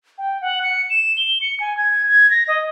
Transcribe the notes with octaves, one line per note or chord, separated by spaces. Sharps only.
G5
F#5
C#7
E7
G7
C#7
G#5
G#6
G#6
A#6
D#5